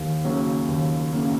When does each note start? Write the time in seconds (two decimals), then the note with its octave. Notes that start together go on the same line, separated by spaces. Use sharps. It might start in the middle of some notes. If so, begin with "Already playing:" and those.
Already playing: D#2
0.24 C#3 F#3 A#3
0.68 D#2
1.12 C#3 F#3 A#3